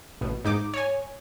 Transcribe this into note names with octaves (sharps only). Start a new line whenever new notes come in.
A1 B2
G#2 D#4 D6
C#5 G#5